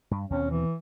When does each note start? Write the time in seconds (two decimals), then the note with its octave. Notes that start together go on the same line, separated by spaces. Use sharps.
0.11 G2
0.30 D#2 B2 C4 C#4
0.51 E3